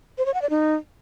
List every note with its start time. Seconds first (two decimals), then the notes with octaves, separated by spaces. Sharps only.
0.18 C5
0.26 C#5
0.34 F#5
0.42 D5
0.50 D#4